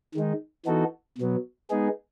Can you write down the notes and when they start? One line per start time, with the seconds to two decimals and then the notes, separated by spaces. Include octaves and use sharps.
0.15 D#3 G#3 D#4
0.66 E3 B3 D#4 F#4 A4
1.18 B2 F#3 B3
1.70 G#3 B3 D#4 G#4